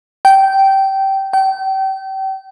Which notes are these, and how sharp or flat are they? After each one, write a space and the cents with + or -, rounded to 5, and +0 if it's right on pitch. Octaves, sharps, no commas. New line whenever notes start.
G5 -15
G5 -35